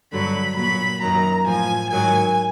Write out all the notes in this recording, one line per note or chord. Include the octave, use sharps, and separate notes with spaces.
G2 D3 F#3 B5
A#2 F#3 B5
F#2 D#3 F#3 A#5
A2 F3 G#5
G#2 D#3 F#3 G#5